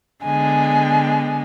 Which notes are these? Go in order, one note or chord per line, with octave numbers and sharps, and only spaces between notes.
D3 G#3 B3 G#5